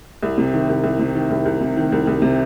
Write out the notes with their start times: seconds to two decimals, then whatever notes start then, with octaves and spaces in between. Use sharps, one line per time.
0.22 C2
0.38 C3
0.53 D#3
0.69 C2
0.84 C2
0.99 C3
1.15 D#3
1.31 C2
1.46 C2
1.61 C3
1.77 D#3
1.92 C2
2.07 C2
2.22 C3